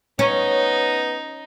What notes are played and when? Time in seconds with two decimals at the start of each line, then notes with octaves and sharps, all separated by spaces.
0.19 B3 C#4 D#4